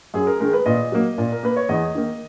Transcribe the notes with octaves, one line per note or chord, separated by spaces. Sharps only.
F#2 G#4
A#4
D#3 G#3 A#4
B4
A#2 D#5
F#3 A#3
A#2
A#4
A#3 B4
C#5
E2 D#5
D#3 A#3